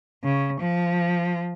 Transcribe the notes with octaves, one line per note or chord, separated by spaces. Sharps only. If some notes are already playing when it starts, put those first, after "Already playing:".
C#3
F3